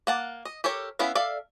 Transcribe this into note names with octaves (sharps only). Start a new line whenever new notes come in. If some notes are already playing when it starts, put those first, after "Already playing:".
A#3 F#5 A5
D#5
G4 A4 A#4 C#5
B3 C#4 E4 E5 F5
A4 D5 E5 F5